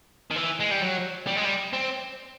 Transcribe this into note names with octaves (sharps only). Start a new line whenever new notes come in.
D#3
E3
G#3
G3
F#3
G3
G#3
G3
C4